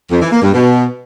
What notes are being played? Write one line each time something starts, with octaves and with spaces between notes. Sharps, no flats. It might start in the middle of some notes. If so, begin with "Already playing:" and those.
F2
E3
A#3
G2
B2